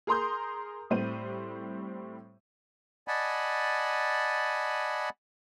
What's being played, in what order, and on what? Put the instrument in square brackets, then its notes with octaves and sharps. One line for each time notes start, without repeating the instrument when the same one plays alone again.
[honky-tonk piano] G#4 A#4 A#5 C6 D#6 G6
A2 G3 C4 C5 D#7
[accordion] D5 D#5 F#5 G#5 A5 B5